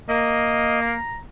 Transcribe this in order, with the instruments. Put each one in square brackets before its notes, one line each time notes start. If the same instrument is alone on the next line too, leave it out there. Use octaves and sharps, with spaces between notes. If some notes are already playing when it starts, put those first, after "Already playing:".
[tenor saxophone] A#3 [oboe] D#5
[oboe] A#5